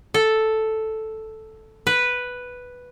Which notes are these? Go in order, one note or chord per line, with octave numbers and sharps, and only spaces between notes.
A4
B4